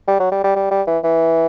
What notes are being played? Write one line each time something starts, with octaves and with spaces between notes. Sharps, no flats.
G3
F#3
G3
G3
G3
G3
E3
E3